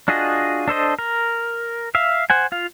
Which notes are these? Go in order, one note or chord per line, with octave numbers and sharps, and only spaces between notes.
D4 F4 F#4 G#4 D#5
D4 A4 C5 D#5
A#4
E5 F5
C5 F#5 G#5
F4 F5